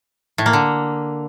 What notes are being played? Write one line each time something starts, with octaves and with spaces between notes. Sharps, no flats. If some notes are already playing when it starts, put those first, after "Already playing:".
A2
A#3
D3